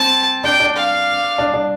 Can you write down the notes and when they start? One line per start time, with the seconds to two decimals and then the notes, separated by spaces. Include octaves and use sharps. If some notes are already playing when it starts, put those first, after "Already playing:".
Already playing: C4 A5
0.44 D4 G5
0.60 D4
0.76 F5
1.38 D4
1.54 D4